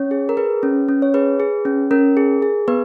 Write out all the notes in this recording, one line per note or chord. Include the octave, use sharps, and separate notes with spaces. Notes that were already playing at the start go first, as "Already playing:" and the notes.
Already playing: C#4 C#5
G#4
A#4
G#4 B4
C#4
C#4
C#5
G#4 B4
G#4
C#4
C#4 A#4
G#4
G#4
B3 B4